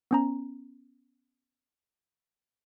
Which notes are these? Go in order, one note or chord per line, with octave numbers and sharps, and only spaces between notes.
B3 C#4 A#5